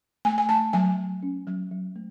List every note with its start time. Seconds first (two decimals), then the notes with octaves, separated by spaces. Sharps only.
0.25 A3 G#5
0.38 G#5
0.49 A3 A5
0.73 F#3 G#5
0.98 F#3
1.23 C#4
1.47 F#3
1.71 F#3
1.96 A3